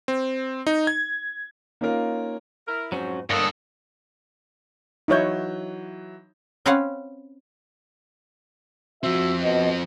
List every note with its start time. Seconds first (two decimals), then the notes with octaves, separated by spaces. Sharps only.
0.08 C4
0.67 D#4
0.87 G#6
1.81 A#3 C#4 D#4 F4 A#4 F5
2.67 E4 A#4
2.92 F2 G#2 F#3 C#4 F#4 C5
3.30 G2 A#3 A4 C#5 D#5 F#5 D#6
5.08 E3 F#3 D#4 E4 C#5 G6
6.66 C4 C#4 B4 C#5 F5 F#5
9.03 F3 C4 F#4 E5
9.43 B2 D#5